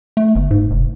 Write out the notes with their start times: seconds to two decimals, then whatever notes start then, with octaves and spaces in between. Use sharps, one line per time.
0.17 A3
0.35 G1
0.51 G#2
0.71 F1